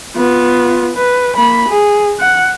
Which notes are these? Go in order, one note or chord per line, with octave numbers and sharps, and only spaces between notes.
B3 F4
B4
A#3 B5
G#4
F#5